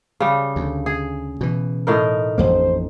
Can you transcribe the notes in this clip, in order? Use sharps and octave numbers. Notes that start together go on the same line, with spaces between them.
C#3 G3
D2
G#4
B2 E3
A2 D#4 A#4
A1 F2 A#3 C5